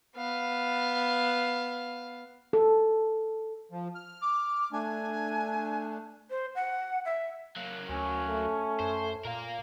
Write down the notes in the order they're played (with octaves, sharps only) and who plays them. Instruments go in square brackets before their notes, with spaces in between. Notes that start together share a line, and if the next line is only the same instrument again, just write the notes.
[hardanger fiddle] B3 F5
[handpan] A4
[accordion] F3
F6
[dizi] D6
[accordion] A3 D4 [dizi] G#5
[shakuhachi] C5
F#5
E5
[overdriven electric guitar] F#3 A#3
[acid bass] D2 [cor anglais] C#4
[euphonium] A3
[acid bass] F#2 [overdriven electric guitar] C5
[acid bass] A#2 [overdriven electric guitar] A#4 F5